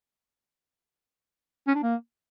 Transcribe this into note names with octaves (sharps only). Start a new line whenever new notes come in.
C#4
D4
A#3